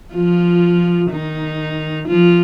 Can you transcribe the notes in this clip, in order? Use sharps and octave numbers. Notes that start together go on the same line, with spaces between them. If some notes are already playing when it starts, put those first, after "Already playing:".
F3 F4
D#3 D#4
F3 F4